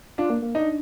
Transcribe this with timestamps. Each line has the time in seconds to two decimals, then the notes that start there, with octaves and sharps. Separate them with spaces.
0.18 D4 F4
0.30 A#3
0.42 A#3
0.55 D4 D#4